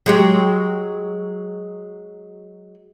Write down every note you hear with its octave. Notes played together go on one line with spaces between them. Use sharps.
F#3 G#3 G4